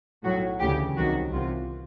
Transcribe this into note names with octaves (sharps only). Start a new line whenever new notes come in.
B1 A2 F#3 F#4
D2 C#3 E3 G4
C2 C3 D#3 F#3 F#4
C2 C3 E3 F4